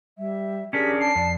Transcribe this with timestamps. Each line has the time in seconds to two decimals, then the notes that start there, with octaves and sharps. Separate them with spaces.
0.18 G3 E5
0.73 C#4 D4 G4 G#4 A#4 B6
1.00 A5 C7
1.15 F2 D5